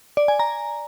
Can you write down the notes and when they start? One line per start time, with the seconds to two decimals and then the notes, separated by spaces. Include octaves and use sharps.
0.17 D5
0.28 G#5
0.39 A#5